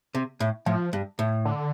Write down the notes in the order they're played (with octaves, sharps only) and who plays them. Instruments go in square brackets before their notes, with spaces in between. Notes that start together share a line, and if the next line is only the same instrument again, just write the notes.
[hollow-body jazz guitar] C3
A2
[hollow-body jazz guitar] A2 [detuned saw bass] F3
[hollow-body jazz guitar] G2
A2
[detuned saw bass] D3